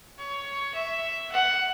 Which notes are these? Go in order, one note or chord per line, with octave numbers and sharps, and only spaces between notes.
C#5
E5
F#5